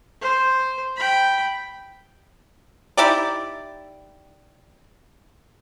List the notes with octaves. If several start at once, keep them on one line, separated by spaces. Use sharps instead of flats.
C5
G5 B5
D#4 E4 G4 D5